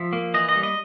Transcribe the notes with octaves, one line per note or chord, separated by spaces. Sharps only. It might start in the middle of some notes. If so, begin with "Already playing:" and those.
Already playing: F3 E5
A#3
E3 D#5
D#5
G3
D#5